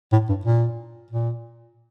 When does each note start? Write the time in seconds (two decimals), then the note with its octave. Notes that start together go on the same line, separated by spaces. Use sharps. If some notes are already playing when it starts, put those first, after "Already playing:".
0.12 A2
0.29 G2
0.45 A#2
1.11 A#2